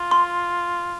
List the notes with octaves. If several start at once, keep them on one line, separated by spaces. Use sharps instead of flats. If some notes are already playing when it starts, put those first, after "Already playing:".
Already playing: F4
C6